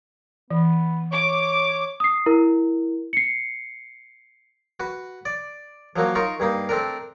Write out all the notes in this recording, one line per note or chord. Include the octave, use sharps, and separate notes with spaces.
E3 B3
C#5 D6
D#6 C7
E4 A#4
C7 C#7
F#4 B4
D5
F3 F#3 A#3 F#4
D#4 F4 A#4 C#6
G2 A#3 D#4
A3 C4 D4 A#4